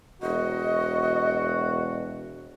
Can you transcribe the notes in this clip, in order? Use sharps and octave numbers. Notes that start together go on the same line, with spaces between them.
E1 F#4 D#5